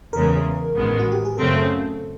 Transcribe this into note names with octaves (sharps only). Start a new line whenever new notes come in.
E2 C#3 E3 G#3 A#4
A1 G#2 D#3 G#3 B3
F#4
G4
G#4
F#2 C#3 F#3 A3 C4 A4